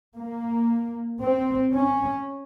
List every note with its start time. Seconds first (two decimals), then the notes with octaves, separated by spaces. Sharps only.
0.17 A#3
1.21 C4
1.73 C#4